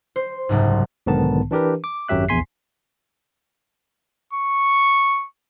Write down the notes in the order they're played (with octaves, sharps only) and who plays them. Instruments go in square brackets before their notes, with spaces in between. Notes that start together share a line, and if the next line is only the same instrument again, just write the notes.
[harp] C5
F#1 C2 G#2
[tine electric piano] B1 G#2 D3 D#3 B3 A5
E3 D4 G4 A#4 B4
D6
G#1 F#2 F#3 G4 E5 F#6
A#1 E2 G#5 C6 B6 C7
[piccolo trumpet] C#6